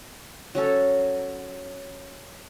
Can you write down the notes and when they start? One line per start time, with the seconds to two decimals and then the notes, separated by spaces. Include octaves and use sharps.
0.55 F#3 C#4 A4